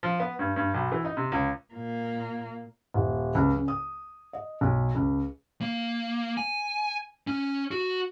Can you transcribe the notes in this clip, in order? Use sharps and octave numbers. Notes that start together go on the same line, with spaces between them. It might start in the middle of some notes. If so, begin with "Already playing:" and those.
F3
B3
G2
G2
B1
E3
D#4
C3
C#2
A#2 A#3
D#1
C#2
C#3
D#6
D#5
B1
C#2
A#3
G#5
C#4
F#4